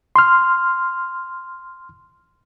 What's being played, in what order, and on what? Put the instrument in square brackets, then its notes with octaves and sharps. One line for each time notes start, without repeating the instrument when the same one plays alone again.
[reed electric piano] C6 F6